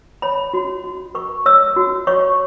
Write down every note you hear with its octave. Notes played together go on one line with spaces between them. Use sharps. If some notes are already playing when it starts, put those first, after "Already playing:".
C#5 B5
F#4
F#4
A#4 C#6
C#5 E6
F#4
C#5 C#6